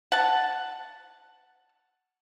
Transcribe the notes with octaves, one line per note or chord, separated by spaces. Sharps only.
F#5 A5